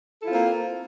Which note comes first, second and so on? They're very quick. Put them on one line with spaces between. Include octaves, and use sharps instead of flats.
A4 E4 F4 C4 A#3